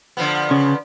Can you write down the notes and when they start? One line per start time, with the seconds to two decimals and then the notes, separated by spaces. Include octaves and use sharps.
0.17 D3 F3 B3
0.51 C#3